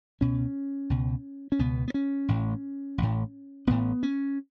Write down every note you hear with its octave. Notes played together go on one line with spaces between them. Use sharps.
C#2 B2 C#4
C#2 B2
C#4
C#2 B2 B3
B3
C#4
A1 A2
A1 A2
A1 A2 B3
C#4